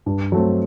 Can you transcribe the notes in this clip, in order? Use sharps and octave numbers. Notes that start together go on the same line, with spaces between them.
G2
F#3 A3 C4